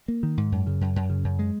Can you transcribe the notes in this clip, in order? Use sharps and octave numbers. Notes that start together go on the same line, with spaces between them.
A#3
D#3
G#2
F#2
C#3
F#2
F#2
C#3
F#2
G#3